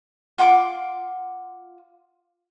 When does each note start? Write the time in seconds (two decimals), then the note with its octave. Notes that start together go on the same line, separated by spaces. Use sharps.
0.38 F4 F#5 C6 D6